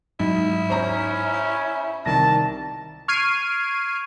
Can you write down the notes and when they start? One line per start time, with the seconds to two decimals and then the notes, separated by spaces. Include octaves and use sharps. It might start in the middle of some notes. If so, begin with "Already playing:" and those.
0.20 G#2 F#3 D#4 E4
0.70 C#4 C5 A#5
1.34 E5
2.06 C2 D#3 A5 A#6
3.08 C#6 F6 G#6 C7 D7 D#7